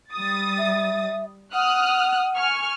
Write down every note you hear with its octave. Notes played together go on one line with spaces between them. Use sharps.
G3 D#6 A6
E5
F#5 D#6 F6 F#6
G#5 C#6 F6